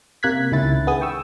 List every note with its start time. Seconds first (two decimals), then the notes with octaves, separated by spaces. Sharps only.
0.23 C3 A#3 F#6 G#6 B6
0.52 C#2 D#3 C#4 E4 A6
0.87 B3 G#4 D#6
1.01 G5 C#6 E6